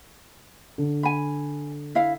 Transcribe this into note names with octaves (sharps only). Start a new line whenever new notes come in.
D3
G#5 B5
E4 F5